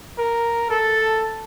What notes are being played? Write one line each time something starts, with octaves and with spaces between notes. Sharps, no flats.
A#4
A4